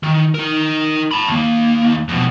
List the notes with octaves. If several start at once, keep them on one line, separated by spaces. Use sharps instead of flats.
D#3
D#4 A#4
A5 B5
D#2 A#3
F2 B2